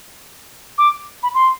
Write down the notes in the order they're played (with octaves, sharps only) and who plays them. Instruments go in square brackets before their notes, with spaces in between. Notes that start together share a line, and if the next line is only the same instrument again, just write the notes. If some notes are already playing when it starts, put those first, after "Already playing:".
[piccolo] D6
B5
C6